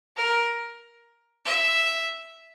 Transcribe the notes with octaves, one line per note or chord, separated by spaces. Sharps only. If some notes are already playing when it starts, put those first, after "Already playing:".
A#4
E5